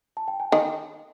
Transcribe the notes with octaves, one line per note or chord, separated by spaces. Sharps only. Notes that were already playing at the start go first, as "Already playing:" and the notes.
A5
G5
G#5
D#3 G5